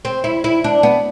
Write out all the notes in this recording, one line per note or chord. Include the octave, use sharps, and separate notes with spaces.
C4
E4
E4
D4
B3